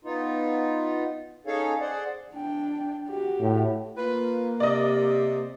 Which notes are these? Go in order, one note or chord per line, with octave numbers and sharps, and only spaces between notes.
B3 D#4 F4
C#4 D#4 G#4 A4 C#5 F5
G#4 C5 D5 F#5
D4 G5
F#4 G4
A2
A#3 F4 B4
C3 D5 D#5